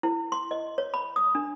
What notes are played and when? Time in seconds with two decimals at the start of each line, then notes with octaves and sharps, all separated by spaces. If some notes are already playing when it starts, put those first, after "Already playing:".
0.03 E4
0.32 C6
0.51 D#5
0.78 C#5
0.94 B5
1.16 D#6
1.35 D4